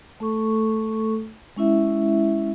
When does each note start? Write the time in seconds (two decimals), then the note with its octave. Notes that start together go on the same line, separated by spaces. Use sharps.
0.20 A3 A4 C#6
1.57 G#3 C#4 E4 E5